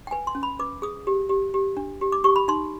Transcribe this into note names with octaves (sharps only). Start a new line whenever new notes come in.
G5
B4 G#5
C6
C#4
B5
B4 D6
G#4 D#6
G4
G4
G4
D4
G4
D6
G4 C#6
B5
D#4 C6